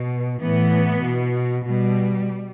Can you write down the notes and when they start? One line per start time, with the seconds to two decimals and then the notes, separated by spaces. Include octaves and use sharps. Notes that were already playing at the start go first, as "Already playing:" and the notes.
Already playing: B2
0.40 A2 E3 B3
1.03 B2
1.67 B2 G3